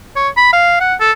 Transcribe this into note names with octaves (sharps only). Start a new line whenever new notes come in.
C#5
B5
F5
F#5
A4